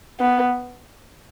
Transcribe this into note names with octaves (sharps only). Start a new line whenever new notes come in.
B3